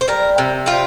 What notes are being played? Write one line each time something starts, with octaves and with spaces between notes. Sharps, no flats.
C5
G3 A#4
C3
G3 F4